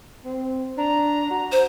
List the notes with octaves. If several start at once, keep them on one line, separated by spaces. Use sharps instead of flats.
C4
D4 A#5
F#4
C5